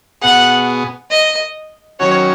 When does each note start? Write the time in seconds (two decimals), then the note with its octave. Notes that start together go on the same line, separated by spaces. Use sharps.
0.21 B2 B3 G#4 F#5
1.10 D#5
1.99 D#3 F#3 C#4 F#4 C#5